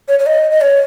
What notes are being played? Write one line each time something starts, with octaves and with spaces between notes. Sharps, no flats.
C#5
C#5
D#5
D#5
C#5